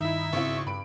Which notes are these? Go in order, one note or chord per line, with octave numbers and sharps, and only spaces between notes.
G2 D#3 D#4 E4 E5
G#1 C#3 C4 E4 C#6
G2 B5 D7